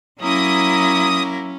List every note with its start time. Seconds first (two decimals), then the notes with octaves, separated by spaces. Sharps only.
0.21 F#3 A#3 C#4 E4 A#4 D#6